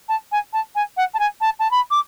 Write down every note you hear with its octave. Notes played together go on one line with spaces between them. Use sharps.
A5
G#5
A5
G#5
F#5
A5
G#5
A5
A5
B5
D6